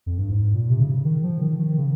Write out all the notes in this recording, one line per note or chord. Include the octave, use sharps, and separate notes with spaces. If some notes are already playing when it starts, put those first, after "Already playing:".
F2
G2
G#2
A#2
C3
C#3
D#3
F3
D#3
D#3
C#3